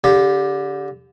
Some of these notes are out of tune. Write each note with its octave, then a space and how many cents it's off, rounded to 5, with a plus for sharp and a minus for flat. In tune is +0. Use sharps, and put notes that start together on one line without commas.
D3 -30 G4 +10